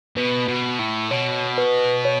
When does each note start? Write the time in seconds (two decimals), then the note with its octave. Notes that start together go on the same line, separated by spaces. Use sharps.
0.16 B2 B4
0.48 B2
0.79 A2
1.11 B2 C#5
1.58 B4
2.05 C#5